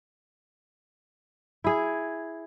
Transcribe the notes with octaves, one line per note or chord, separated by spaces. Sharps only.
E4 G#4